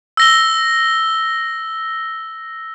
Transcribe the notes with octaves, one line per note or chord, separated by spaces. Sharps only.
E6 A#6 G7